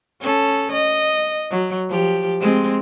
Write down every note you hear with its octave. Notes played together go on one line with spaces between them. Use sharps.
C#4 A4
D#5
F#3
F3 G4
G#3 C4